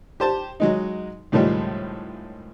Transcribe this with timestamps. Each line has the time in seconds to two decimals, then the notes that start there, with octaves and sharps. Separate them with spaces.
0.20 G4 C5 A5
0.60 F#3 G#3 D#4
1.32 C#2 A2 D#3 F3 G3 G#3